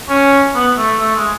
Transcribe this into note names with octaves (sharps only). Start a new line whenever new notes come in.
C#4
B3
A3
A3
G#3